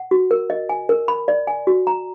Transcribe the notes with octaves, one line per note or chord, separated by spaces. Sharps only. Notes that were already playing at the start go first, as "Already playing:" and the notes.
Already playing: F#5
F#4
A#4
D#5
G#5
A#4
B5
D5
G#5
F#4
A#5